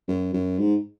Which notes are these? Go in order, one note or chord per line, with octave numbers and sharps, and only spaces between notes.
F#2
F#2
G#2